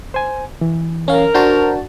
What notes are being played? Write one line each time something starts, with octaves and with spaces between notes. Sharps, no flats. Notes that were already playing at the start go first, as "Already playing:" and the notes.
C5 G#5
E3
C#4 A#4 F5
D4 F#4 C5 A5 A#5 G6